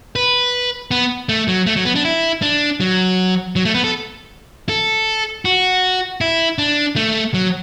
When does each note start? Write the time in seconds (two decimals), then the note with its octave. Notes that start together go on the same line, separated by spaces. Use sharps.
0.16 B4
0.91 B3
1.29 A3
1.48 F#3
1.66 A3
1.76 F#3
1.85 B3
1.95 D4
2.05 E4
2.42 D4
2.80 F#3
3.56 F#3
3.65 A3
3.74 B3
3.84 A4
4.69 A4
5.45 F#4
6.21 E4
6.58 D4
6.96 A3
7.34 F#3